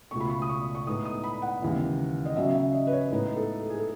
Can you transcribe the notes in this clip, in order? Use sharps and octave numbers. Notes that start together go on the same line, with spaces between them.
C#2 B2 A3 C#6
B5
C#6
D#6
C#6
C#6
A2 G#3 B3 D#4 D#6
D#6
B5
F#5
D#2 C#3 E3 G#3
D#5
C#3 F#3 C#4 E5
E5
D#5
B4
C#5
A2 G#3 B3 D#4 B4
A4
A4
G#4
A4